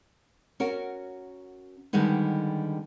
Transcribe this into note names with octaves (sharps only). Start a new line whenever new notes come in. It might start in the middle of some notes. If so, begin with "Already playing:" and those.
C#4 F#4 A#4
D3 D#3 G3 G#3 B3 D#4